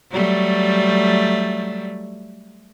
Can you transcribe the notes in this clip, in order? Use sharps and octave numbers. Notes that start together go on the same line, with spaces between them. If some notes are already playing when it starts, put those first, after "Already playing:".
F#3 G3 A3